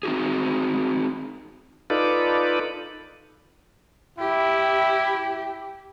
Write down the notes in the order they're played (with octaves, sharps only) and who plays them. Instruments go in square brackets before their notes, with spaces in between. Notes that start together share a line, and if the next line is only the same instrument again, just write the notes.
[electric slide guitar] C4 D#4 F#4 G#4
[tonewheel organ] D#4 F4 A4 B4 D5
[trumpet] E4 [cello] G4